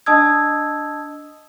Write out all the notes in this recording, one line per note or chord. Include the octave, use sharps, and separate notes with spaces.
D4 D#5 A5 D#6 E6 G#6